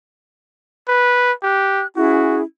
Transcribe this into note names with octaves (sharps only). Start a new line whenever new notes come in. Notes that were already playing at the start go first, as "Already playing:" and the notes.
B4
G4 F#6
C#4 E4 F#4 G#4